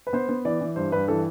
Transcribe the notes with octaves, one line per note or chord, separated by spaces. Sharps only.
B4
B3 C5
B3
E3 D5
E3
G2 C5
G2 B4
E3 A4